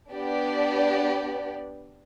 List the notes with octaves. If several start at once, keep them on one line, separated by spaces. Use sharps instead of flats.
B3 D4 G4 D5